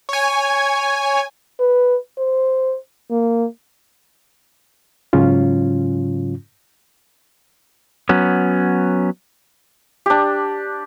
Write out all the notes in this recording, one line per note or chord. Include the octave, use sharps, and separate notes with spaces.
C#5 G#5
B4
C5
A#3
G#2 C#3 F#3 C#4 F4
F#3 B3 C#4
D4 G4